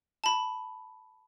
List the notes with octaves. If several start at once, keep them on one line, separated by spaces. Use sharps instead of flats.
A5 B5